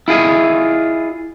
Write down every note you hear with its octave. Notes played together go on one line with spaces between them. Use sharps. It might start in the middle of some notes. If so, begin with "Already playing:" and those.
E4 F4 G#4 D#5